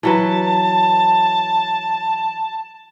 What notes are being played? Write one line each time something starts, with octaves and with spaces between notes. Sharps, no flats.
E3 F#3 B4 A5